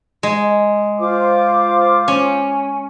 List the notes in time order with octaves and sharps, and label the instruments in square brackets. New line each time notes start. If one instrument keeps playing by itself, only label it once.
[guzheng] G#3
[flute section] F4 C5 D6
[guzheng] C#4